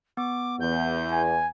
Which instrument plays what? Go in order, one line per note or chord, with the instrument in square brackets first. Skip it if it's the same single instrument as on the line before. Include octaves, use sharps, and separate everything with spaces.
[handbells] B3 [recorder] D6
[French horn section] E2 [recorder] G6
[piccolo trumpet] G#5